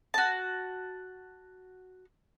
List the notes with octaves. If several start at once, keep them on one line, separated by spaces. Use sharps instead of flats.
F#4 A5